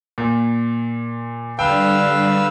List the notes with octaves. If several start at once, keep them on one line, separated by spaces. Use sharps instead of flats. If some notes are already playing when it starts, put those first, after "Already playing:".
A#2
D3 G3 D4 B4 F5 G5 E6